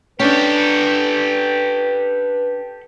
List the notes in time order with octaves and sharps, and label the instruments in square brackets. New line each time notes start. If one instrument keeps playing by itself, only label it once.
[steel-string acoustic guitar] C#4 D4 [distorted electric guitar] G4 A4 [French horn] B4